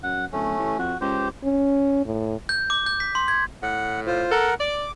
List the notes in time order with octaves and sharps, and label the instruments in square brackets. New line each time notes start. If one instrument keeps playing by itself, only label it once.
[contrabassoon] F#2 [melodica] F#5
[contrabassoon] D1 [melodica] A3 C#4
[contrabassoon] A1
[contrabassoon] F2 [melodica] F#4
[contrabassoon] C#2 [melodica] G4 C5
[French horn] C#4
A2
[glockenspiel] G6
D6
G6
B6
C6
G#6
[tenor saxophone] A2 [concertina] F#5
[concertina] F4 C5
[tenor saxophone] A4 [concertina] A#4 F#5
[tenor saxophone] D5 [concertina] D6